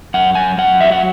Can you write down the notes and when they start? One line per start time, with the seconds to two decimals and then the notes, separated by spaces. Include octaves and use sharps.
0.14 F#2 F#5
0.35 F#2 G#5
0.58 F#2 F#5
0.80 F#3 E5
0.92 F#5